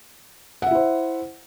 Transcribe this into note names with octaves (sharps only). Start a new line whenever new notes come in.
E4 C5 E5 F#5